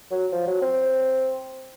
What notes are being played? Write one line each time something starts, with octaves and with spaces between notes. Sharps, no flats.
F#3
F3
F#3
C4